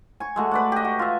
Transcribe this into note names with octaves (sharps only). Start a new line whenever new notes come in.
G#5 C#6
G#3 A3 F#4
B4 D5 F#5
G4 D#5
F#4
F4 E5